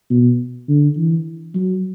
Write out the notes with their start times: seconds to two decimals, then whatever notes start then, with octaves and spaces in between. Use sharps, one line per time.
0.10 B2
0.68 D3
0.97 E3
1.55 F#3